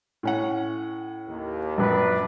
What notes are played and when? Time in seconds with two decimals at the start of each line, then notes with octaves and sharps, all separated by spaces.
0.23 A2 C#4 F#5
1.29 D#2
1.78 A#1 F#2 D4 B4